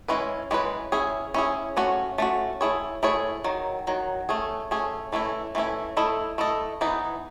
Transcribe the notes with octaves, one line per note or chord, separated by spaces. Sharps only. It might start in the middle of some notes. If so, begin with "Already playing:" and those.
E3 G#3 C#4 E4 B4
E3 G#3 C#4 E4 B4
C#4 E4 G#4
C#4 E4 G#4
A3 C#4 F#4
A3 C#4 F#4
A3 E4 G#4 C#5
A3 E4 G#4 C#5
D#3 F#3
D#3 F#3
A3 C#4 G#4
A3 C#4 G#4
E3 A3 C#4 E4
E3 A3 C#4 E4
A3 E4 A4 D#5
A3 E4 A4 D#5
E3 B3 D#4